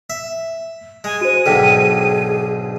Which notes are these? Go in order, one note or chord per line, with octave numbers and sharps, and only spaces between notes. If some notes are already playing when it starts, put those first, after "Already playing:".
E5
G#3 G#5
F#4 C5 D#7
B1 G#2 D3 G#4 A4 G5 B6